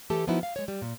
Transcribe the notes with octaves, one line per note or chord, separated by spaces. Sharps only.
E3 A3 G4 A4 A5
F3 B3 D#4 E4 F#4
F5
G#3 C#5
G3
A#2